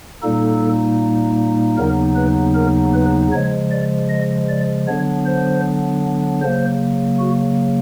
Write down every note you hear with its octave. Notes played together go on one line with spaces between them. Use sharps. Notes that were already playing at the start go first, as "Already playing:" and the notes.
A#2 G3 A#3 D#4 A4
D#2 C#3 F#3 B3 D#4 A#4
B4
A#4
B4
C#3 F3 G#3 C#5
D5
D#5
D5
D3 F#3 B3 D4 C#5
C5
C#3 F#3 A#3 C5
F#4